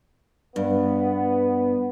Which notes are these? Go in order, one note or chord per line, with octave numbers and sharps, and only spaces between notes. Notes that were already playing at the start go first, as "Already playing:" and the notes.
G2 B3